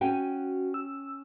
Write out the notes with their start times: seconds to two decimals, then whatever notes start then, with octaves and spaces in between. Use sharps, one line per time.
0.01 C#4 F#4 G5 G#5
0.74 E6